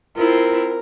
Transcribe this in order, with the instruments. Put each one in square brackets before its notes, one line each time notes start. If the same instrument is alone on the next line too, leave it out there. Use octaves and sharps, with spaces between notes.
[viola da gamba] C4 E4 F4 [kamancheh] A#4